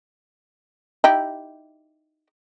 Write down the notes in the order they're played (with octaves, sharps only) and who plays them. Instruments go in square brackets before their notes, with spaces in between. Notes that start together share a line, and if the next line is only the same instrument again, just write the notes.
[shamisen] D#4 E4 G4